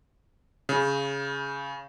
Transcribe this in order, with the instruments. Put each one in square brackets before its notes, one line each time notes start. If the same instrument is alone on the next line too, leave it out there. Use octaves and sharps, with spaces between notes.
[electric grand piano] C#3